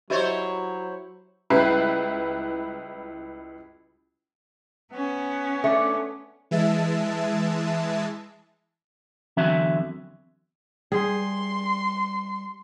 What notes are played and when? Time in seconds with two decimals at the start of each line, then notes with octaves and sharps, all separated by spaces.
0.10 F#3 E4 G4 C5 C#5 D#5 E5
1.50 C#2 G3 E4 B4 C7
4.93 B3 C#4
5.64 A3 D4
6.51 E3 G#3 E5 A5
9.37 E2 D3 F#3 C4 E5
10.92 G3 G#4 C6